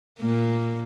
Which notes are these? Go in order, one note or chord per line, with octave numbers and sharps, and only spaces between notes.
A#2 A#3